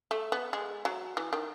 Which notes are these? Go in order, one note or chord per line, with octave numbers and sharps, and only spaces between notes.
A3
B3
G#3
F#3
E3
D#3